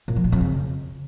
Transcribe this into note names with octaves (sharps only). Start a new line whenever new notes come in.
A#2
F3
A#2
F2
C#3